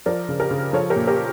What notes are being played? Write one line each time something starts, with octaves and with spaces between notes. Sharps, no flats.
F3 A#4 D5
C#3
G4 A#4
C#3
F3 A4 C#5
G4 A#4
A#2
G4 A#4